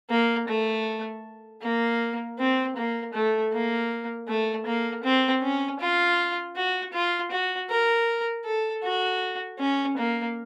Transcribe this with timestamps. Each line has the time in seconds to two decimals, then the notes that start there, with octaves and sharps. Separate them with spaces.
0.10 A#3
0.48 A3
1.62 A#3
2.39 C4
2.77 A#3
3.14 A3
3.53 A#3
4.28 A3
4.66 A#3
5.04 C4
5.42 C#4
5.80 F4
6.56 F#4
6.93 F4
7.31 F#4
7.70 A#4
8.45 A4
8.84 F#4
9.59 C#4
9.97 A#3